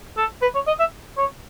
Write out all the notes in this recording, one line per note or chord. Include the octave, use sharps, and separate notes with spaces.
A4
B4
C#5
D#5
E5
C#5